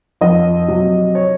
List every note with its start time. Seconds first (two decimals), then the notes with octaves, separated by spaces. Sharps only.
0.21 F2 D#5
0.68 C3 F#3
1.15 C#5